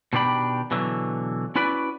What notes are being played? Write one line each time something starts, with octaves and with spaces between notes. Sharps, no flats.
B2 D#3 D4 G4 B5
B2 D3 E3 F#3
C#4 E4 F#4 B4 D5 B5